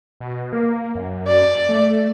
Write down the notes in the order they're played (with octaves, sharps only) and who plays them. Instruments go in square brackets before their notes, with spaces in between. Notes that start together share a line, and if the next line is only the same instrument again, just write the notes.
[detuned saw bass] B2
A#3
F#2
[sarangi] D5
[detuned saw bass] A3